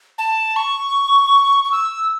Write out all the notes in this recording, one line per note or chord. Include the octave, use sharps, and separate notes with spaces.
A5
C#6
C#6
E6